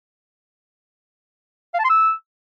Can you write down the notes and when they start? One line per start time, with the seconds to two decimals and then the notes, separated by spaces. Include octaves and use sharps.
1.74 F5
1.79 A5
1.84 C6
1.90 E6